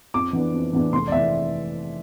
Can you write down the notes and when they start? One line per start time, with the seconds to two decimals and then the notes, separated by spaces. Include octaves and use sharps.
0.14 F2 D6
0.33 E3 B3 D4
0.54 F2
0.73 E3 B3 D4
0.92 F1 C6
1.07 D5
1.12 E3 E5